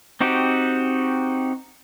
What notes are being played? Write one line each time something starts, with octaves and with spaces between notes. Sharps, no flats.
C4 D#4 F#4 G4